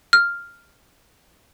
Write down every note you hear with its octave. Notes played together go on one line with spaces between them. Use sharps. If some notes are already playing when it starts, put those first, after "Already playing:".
F6